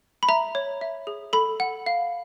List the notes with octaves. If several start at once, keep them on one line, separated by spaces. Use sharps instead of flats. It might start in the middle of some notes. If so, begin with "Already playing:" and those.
B5
E5 A#5
C#5
E5
G#4
A4 B5
F#5
F5